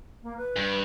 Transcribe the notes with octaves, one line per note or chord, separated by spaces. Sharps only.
A#3
B4
G2